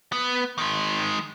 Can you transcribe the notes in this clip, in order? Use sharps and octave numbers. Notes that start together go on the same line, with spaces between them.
B3
D#3 G#3